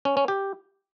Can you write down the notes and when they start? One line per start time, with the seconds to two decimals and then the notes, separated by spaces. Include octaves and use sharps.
0.05 C#4
0.17 C#4
0.28 G4